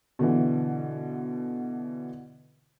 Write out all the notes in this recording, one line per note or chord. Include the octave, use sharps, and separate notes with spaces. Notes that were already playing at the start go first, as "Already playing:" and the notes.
B2 D3 E3